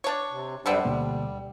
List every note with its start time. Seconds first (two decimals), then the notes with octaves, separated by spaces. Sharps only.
0.04 D4 C#5
0.31 C3
0.66 F#2 D3 G3 B3 C4 D4
0.85 D2 B2 G3 A#3